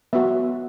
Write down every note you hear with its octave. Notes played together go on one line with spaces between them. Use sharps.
B3 F#4 E5